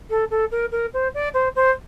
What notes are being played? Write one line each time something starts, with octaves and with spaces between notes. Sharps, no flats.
A4
A4
A#4
A#4
C5
D5
C5
C5